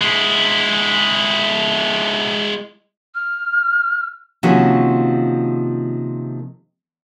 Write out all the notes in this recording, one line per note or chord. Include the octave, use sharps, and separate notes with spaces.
G#3 E4
F6
C3 D#3 F3 A#3 C#4 F#4